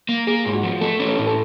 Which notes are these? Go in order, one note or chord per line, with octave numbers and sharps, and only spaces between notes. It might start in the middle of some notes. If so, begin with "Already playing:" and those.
A#3
A#3 G#4
G#2
F#4
F3
A3 A4
C#4
A4
A2
A4